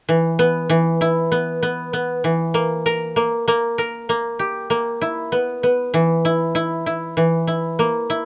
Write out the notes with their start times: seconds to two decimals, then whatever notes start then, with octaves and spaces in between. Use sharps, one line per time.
0.09 E3
0.39 B3
0.70 E3
1.01 E4
1.32 B3
1.63 B3
1.93 B3
2.24 E3
2.54 A#3
2.86 A#4
3.16 A#3
3.48 A#3
3.78 A#4
4.09 A#3
4.39 G4
4.70 A#3
5.01 E4
5.32 B3
5.63 B3
5.94 E3
6.25 E4
6.55 E4
6.86 E4
7.17 E3
7.47 E4
7.79 A#3
8.10 E4